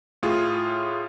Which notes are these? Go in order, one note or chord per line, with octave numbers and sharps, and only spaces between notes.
A2 F4 G#4